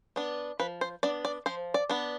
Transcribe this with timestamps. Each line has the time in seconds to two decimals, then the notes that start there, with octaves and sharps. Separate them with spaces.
0.16 B3 D4
0.60 F3 B4
0.81 C5
1.03 B3 D4 D5
1.25 D5
1.46 F3 C5
1.74 D5
1.89 B3 D4